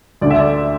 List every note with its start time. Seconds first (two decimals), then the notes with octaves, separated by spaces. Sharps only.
0.21 D2 D3 D5
0.31 E5
0.40 D5